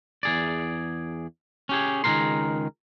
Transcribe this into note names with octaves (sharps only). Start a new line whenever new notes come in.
E2 G#4 D5
C#4 G4 G#4
C#2 D#3 E3 G#4 A#4 C6